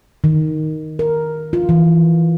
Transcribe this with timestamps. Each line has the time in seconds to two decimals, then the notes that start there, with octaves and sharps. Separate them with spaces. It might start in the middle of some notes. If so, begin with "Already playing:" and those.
0.24 D#3
0.99 A#4
1.53 F4
1.69 E3